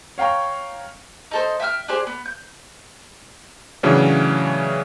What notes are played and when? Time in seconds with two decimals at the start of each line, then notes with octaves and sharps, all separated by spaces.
0.18 C#5 F5 G5 A#5 C#6
1.31 D#4 A4 C5
1.60 E5 G5 D#6 F6
1.88 D4 G4 G#4 C5
2.07 B3
2.25 G6
3.83 A2 C#3 E3 F#3 C#4 D4